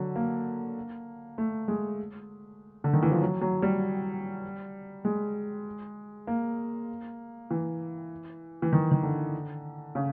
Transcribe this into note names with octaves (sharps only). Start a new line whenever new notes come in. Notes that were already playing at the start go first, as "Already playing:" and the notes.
Already playing: D3 F#3
A#3
A3
G#3
D3
D#3
E3
F3
F#3
F#3
G3
G#3
A#3
E3
E3
D#3
D#3
D3
C#3